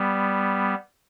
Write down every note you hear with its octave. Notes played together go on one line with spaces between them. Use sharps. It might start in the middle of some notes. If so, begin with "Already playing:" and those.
Already playing: G3 B3